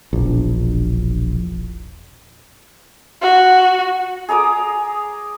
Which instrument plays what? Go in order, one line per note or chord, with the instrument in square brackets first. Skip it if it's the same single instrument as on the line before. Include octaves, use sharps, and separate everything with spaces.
[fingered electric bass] E1 A#1
[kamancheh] F#4
[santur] G#4 A#5 D6 D#6